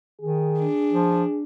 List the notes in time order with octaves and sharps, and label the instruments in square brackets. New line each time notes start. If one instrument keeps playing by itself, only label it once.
[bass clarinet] D#3 [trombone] G#4
[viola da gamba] D4
[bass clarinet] F3